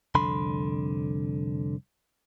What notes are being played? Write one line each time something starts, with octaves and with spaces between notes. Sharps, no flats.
C2 F2 D3 B5 C6